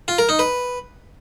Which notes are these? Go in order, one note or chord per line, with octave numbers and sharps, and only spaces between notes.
F4
A#4
D#4
B4